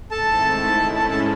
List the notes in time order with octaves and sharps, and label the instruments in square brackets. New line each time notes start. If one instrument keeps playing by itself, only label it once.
[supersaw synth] G#2 D#3 A3 C4 E4 [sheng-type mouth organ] A4 A5
[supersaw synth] A2 G#3 C#4 E4
[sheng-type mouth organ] A4 A5
A4 A5